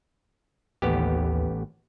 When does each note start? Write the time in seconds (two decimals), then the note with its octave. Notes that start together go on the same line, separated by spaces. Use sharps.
0.82 A1 D#2 B3 G4